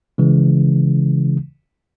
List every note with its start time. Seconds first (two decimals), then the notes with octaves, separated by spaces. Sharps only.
0.18 C#3 E3 G#3